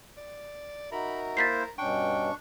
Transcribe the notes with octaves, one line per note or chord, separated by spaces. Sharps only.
D5
D#4 F#4 A#4 E5 B5
A#3 E4 C5 A6 B6 C7
G2 B2 C#4 D4 G5 C#6